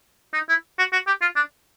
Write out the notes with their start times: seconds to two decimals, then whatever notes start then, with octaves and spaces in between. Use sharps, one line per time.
0.34 D#4
0.49 E4
0.78 F#4
0.92 F#4
1.07 G4
1.21 F4
1.36 D4